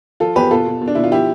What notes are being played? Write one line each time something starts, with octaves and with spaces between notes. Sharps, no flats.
F3 F4 A4
E2 G4 B4
B2 F4 A4
B2
B2
D4
B2 E4
F4
F3 E4 G4